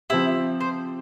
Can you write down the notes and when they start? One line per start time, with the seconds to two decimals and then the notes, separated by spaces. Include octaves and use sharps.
0.10 F3 C4 E4 G4
0.60 C5